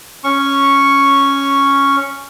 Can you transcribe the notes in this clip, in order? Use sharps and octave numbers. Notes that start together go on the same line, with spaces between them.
C#4 C#6